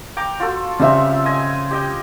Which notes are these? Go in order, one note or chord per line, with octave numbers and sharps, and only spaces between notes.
G5 A#5 D6
F4 F#4 A4
C#3 G3 C4 F4 E5
D#5 G#5
G4 D#5 G5